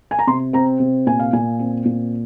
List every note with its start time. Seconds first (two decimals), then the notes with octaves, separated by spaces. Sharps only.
0.11 G#5
0.19 A#5
0.27 C3 C6
0.53 C4 A#5
0.80 C3
1.06 A#2 G#5
1.19 F5
1.33 A#2 G#5
1.59 C4
1.85 A#2